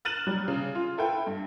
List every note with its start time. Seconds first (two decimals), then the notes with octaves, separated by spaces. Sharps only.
0.05 F6 F#6 A6 D#7 E7 F#7
0.27 F#3 G3
0.48 C#3
0.75 F4
0.98 E4 A4 B4 G5
1.27 G2